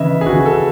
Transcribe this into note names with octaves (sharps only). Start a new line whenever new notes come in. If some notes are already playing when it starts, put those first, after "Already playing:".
Already playing: C#3 E3 D#5 E5
G#4
C#3 F#4
A4